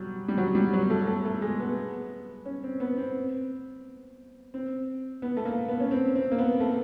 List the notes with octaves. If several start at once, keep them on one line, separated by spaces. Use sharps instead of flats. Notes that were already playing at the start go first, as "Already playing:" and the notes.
Already playing: F#3 G3
G3
F#3
G3
F#3
A3
A3
A3
G#3
B3
C#4
C4
B3
C4
C4
B3
A3
A#3
B3
C#4
C4
C4
A#3
B3
A3